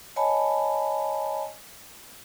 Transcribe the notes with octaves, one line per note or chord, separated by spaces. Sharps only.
C#5 D#5 G#5 A5 B5